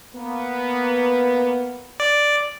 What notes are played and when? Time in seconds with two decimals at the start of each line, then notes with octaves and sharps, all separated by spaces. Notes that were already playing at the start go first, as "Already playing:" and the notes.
0.15 A#3 B3
2.00 D5